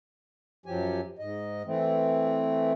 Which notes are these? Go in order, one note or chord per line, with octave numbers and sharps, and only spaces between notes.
F#2 F3 F#3 G4 G#5
G#2 D#5
E3 A3 C4